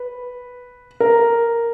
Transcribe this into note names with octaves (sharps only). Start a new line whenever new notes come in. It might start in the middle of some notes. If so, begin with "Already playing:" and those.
Already playing: B4
A#4